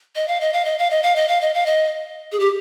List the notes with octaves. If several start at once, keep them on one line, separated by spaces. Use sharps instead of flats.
D#5
F5
D#5
F5
D#5
F5
D#5
F5
D#5
F5
D#5
F5
D#5
G#4
G4